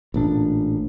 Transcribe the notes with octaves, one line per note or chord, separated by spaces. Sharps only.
A1 A#2 D4